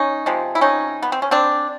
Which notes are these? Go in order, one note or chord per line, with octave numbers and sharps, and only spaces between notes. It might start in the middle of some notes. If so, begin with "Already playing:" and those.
Already playing: C#4 D#4
C3 F3 G#3
E4
C#4 D#4
B3
C4
C#4
C4 D4